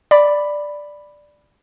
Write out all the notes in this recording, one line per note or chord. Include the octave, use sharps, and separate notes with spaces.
D5 B5